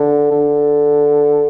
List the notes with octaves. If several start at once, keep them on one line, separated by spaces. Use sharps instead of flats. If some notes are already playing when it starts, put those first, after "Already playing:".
Already playing: D3
D3